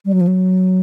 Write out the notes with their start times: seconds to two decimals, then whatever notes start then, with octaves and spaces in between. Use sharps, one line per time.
0.05 G3
0.13 F#3
0.21 F3
0.27 F#3